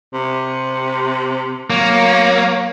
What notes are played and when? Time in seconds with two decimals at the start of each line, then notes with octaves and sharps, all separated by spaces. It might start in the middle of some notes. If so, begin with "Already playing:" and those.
0.14 C3
1.70 F#3 A#3